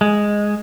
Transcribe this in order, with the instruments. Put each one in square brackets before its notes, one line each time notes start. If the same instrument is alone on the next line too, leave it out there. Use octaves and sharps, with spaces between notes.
[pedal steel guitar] G#3